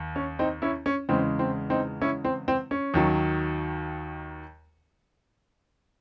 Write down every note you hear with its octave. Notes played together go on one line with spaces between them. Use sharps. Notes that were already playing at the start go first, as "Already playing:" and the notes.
Already playing: D#2
C#4
C4 D#4
C#4 E4
C#4
E2 C#3 G#3 C4
C4
C4 D#4
C#4 E4
C4
C4
C#4
D#2 D#3 F#3